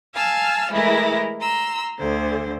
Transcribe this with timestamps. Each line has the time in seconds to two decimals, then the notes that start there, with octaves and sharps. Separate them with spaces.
0.14 F5 G#5 A5 E6 F6
0.72 E3 G#3 A3 E4 G#4 A#4
1.41 A#5 C6 E6
1.99 D2 D3 C5